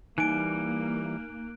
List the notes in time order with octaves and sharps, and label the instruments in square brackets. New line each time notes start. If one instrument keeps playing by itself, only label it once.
[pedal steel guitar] E3 G3 [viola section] A#3 [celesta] D#4 G#5 [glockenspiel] F#6 D7